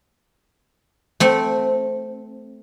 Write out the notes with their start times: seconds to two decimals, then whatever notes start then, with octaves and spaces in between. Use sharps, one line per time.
1.20 A3 C4